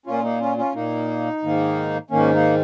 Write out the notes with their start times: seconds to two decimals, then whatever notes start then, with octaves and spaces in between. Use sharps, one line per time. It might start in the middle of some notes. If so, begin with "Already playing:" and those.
0.06 A#2 A#3 C#4 F4
0.23 A#3 D#4
0.40 C#4 F4
0.58 C#4 F4
0.74 A#2 A#3 D#4
1.43 G#2 D#3 A#3
2.10 G#2 D#3 A#3 C#4
2.34 A#3 D#4